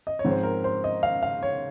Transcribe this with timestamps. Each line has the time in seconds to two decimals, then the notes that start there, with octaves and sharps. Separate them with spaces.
0.07 D#5
0.19 C#5
0.25 G#2 F3 C4
0.31 C5
0.43 A#4
0.64 C5
0.84 D#5
1.03 F5
1.23 F5
1.43 C#5